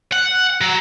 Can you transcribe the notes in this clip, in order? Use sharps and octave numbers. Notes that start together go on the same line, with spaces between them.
F#5
F#3